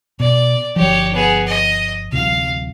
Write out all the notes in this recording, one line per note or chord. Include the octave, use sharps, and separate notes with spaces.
B2 D5
G1 F3 G4 C#5
B3 G#4
D#5
D1 C3 F5